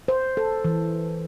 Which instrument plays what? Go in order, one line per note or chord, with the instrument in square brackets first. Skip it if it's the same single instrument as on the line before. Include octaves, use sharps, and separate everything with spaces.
[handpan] C5
A4
E3